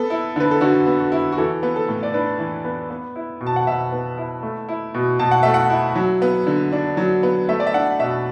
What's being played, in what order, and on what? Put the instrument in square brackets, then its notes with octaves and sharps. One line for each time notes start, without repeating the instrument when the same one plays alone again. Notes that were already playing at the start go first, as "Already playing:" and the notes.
Already playing: [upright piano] B3 A4
E4
D3 B4
A4
D3 F#4
B3
F#4
E4
F#4
E3 A4
B3
A4
A2
D5
D4 B4
E3
B3
B3
E4
B2
A5
F#5
B2 E5
B3
E4
A3
E4
B2
B2 A5
F#5
A3 E5
F#5
E4
F#3
B3
D3
D4
F#3
B3
A3 E5
D5
E5
D4 F#5
B2 E5